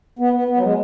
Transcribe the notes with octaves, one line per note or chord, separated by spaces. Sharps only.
B3
B3
B3
F#3
G#3